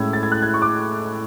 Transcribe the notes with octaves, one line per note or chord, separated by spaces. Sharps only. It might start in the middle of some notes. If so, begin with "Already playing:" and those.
Already playing: A2 G#3 C#4 E6 G#6
A6
G#6
F#6
G#6
C#6
D6